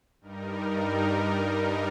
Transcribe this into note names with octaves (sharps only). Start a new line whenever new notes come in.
G2 G3 D#4 A#4